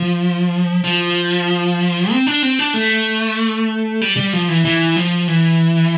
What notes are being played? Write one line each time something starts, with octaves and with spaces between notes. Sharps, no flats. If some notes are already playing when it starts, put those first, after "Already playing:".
Already playing: F3
F3
C4
D4
C4
D4
A3
G3
G3
F3
E3
E3
F3
E3